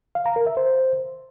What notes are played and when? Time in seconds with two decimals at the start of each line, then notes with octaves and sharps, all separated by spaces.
0.15 F5
0.26 A#5
0.36 A#4
0.46 E5
0.57 C5